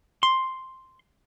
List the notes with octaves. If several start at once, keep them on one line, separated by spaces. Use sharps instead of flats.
C6